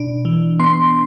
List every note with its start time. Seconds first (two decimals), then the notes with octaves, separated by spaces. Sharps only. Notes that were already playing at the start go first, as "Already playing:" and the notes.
Already playing: B2 D4
0.25 E3
0.59 B3 C6